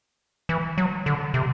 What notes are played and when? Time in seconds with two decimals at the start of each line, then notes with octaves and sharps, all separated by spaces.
0.49 E3
0.78 F#3
1.06 D3
1.34 C3